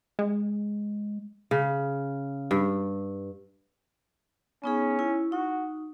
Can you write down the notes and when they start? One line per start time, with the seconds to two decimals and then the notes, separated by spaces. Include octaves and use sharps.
0.19 G#3
1.51 C#3
2.51 G2
4.64 B3 C#4 D#4 G#4
4.99 E4
5.32 D#4 F#4